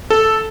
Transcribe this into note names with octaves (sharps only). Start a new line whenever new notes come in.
A4